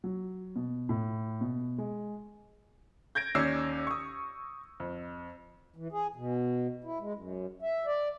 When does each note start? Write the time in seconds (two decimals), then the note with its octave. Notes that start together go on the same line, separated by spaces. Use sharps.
0.04 F#3
0.56 B2
0.89 A2
1.41 B2
1.78 G#3
3.15 G6 G#6 A#6 D7
3.35 D#2 C#4 D5 D6 E6 C7
3.87 C#6 D#6
4.80 F2
5.76 E3
5.92 G#4
6.16 B2
6.84 E4
7.00 G#3
7.13 F#2
7.62 E5
7.86 D5